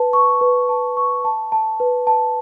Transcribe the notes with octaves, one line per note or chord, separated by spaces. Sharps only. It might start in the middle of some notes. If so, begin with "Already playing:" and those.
Already playing: B4 A5
C#6
B4
A5
C#6
A5
A5
B4
A5